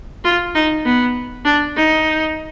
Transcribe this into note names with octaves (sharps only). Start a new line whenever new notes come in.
F4
D#4
B3
D4
D#4